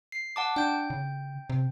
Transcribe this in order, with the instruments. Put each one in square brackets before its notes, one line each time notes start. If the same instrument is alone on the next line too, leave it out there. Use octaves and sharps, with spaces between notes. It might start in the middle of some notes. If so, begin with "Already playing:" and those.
[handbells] C7
F#5 A5 D6
[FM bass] D4 [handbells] G5 G6
[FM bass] C#3
C3